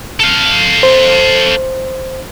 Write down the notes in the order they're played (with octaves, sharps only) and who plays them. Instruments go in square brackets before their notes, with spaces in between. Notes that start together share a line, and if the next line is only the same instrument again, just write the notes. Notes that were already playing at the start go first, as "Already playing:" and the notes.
[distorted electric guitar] A4 F5
[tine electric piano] C5